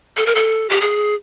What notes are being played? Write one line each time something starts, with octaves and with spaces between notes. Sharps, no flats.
A4
A#4
A4
G4
G#4